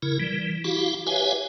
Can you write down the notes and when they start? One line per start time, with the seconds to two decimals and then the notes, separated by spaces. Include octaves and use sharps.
0.02 C#3 E4 A#4
0.20 E3 G3
0.64 E4 F#4 G4 F5
1.07 G4 B4 C#5 E5 F5 G#5